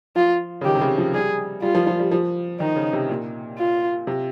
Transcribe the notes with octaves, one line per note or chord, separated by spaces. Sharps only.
F3 F4
C#3
D#3 G4
C3
C#3
F3
G3 G#4
G3 F4
F3
F3
G3
F3
D#3 D#4
C#3
C3
A#2
F4
C3